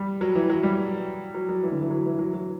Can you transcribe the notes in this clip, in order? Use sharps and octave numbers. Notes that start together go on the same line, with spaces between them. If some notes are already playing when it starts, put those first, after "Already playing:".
Already playing: G3
F#3
E3
F#3
G3
F#3
F#3
E3
D3
E3
F#3
E3
F#3
F#3